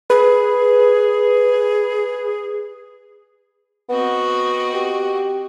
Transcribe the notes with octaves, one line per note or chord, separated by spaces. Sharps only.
G#4 B4
B3 C4 F#4 D#5
G4